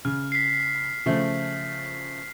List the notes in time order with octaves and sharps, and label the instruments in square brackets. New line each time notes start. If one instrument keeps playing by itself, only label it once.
[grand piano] C#3 [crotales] F6
[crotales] B6 C7
[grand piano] C#3 F3 A3